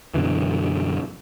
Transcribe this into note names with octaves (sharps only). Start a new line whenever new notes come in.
F#2 B2 D3 E3